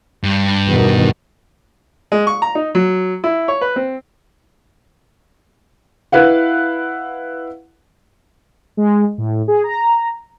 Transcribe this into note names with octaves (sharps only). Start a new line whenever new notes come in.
G2
E2 B2 D#3
G#3
C#6
A#5
D#4
F#3
E4
C#5
B4
C4
E4 B4 F5 F#5
G#3
A2
G#4
A#5